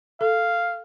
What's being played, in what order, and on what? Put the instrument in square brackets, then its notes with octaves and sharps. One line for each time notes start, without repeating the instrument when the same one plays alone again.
[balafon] A4 [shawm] F5